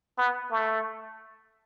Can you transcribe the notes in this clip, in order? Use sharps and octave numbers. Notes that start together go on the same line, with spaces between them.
B3
A3